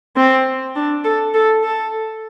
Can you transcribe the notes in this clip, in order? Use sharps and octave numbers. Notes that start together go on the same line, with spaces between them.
C4
D4
A4
A4
A4